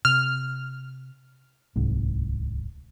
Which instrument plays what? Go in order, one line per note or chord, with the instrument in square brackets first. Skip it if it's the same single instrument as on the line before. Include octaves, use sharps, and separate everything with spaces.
[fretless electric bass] C3 [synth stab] F6
[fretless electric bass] D1 C2 G#2